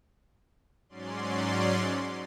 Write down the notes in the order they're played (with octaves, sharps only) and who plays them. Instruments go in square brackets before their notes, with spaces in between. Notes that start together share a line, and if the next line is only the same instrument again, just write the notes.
[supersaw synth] G#2 F#3 C#4 D5 C6